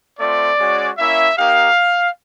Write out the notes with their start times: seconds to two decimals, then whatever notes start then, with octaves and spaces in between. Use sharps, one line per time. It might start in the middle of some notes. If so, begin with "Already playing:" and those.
0.19 A3 C4 F4 D5
0.59 G#3 C#4 F#4
0.98 A#3 C#4 E4 E5
1.38 A#3 D#4 G4 F5